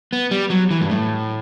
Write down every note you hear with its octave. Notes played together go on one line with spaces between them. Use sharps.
B3
G3
F#3
E3
G2
A2